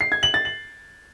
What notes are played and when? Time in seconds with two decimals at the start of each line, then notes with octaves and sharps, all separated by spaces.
0.01 C7
0.12 G#6
0.23 F#7
0.34 A6
0.45 F#7